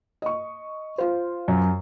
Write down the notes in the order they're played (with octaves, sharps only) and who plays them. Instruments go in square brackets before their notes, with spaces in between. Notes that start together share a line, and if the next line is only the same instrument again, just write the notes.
[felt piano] D#5 C#6
F4 C5
[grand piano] F#2